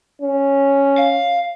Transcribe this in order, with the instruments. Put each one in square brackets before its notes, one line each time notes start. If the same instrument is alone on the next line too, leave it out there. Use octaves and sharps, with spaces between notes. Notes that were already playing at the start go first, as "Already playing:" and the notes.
[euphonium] C#4
[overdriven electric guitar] F5